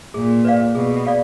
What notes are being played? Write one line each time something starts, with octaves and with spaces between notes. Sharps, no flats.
A#2 G#4
B4 D5 F5
B2 G#4
D5 F5